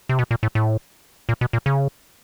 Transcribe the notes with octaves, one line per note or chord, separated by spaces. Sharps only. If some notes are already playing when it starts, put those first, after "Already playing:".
C3
B2
A#2
A2
A2
A#2
B2
A#2
C#3